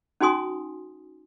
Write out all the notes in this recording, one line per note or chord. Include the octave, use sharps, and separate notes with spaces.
C#4 D#4 F#4 G#5 C6 D#6